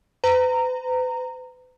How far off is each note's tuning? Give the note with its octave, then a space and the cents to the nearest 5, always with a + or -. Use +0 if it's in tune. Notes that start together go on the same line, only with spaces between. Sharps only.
B4 +40 A#5 -20